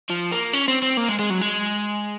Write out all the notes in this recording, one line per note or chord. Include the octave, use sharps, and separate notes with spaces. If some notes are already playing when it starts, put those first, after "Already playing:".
F3
A#3
C#4
C4
C4
A#3
G#3
G#3
F#3
G#3